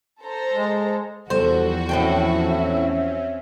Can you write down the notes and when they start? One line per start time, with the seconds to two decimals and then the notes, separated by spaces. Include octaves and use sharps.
0.21 A4 C5 A#5
0.54 G#3
1.30 E2 F3 G3 F#4 A4 C5
1.89 A2 C4 C#4 A4 E5 G5